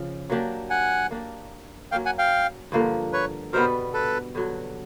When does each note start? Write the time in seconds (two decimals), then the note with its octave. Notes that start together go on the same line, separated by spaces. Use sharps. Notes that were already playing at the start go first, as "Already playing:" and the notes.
Already playing: C#3 F3
0.30 F#3 A#3 D4 G4
0.70 F#5 G#5
1.11 A#3 D4 G4
1.92 F#3 A#3 C#4 F5 G5
2.06 F#5 G#5
2.18 F5 G5
2.72 G2 D3 F3 A#3
3.13 B4 C#5
3.53 B2 G3 B3 A#4 C5
3.94 A4 B4
4.35 G2 D3 F#3